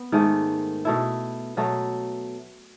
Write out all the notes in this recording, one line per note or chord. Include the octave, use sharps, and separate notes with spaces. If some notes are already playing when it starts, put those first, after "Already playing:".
Already playing: B3
G#2 D#3 A3
B2 A3 E4
B2 F#3 A3